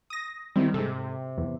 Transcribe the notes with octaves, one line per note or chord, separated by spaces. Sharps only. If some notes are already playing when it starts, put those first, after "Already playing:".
D#6 A#6
D#3 G3 C4 E4
G#2 C3 A4
E2